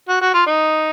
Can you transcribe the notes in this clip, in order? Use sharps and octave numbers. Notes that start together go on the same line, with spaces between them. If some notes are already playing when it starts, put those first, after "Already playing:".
F#4
F#4
F4
D#4